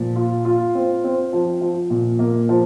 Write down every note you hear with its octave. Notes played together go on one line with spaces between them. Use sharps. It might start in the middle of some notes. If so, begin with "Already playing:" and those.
Already playing: A#2 F3
F4
F4
C4
C4
F3
F3
A#2
A#3
F3